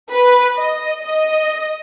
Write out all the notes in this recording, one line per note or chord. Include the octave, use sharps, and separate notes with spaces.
B4
D#5
D#5